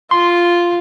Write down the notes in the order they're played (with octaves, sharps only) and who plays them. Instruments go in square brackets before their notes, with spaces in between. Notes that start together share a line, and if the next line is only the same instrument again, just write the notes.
[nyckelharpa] F4 [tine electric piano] C6